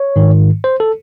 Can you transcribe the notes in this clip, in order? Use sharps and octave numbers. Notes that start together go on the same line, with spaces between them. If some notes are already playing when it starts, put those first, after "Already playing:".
Already playing: C#5
G#2 D#3
C5
A4